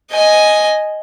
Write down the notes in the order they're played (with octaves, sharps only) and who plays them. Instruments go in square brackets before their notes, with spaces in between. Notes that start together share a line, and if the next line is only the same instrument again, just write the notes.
[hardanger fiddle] D#5 G#5